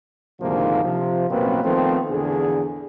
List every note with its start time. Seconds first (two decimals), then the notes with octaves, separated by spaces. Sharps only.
0.41 D2 G#2 C3 D#3 F3 A#3
0.83 C3 F3
1.30 A1 F#2 B2 A#3 C4 B4
1.63 D#3 F3 A3 B3 C4
2.10 A#1 E2 D3 G#4